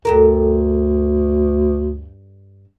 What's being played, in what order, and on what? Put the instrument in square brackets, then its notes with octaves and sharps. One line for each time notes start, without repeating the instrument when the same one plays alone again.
[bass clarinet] D2 [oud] G2 A4 A#4